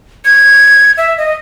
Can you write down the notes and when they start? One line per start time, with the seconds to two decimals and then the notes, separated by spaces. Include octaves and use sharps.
0.25 G#6
0.98 E5
1.18 D#5